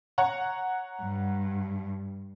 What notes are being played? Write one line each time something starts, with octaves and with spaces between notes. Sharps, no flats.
C#5 F#5 A#5
G2